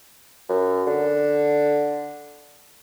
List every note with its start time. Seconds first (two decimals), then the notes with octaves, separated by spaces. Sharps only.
0.49 F#2
0.87 D3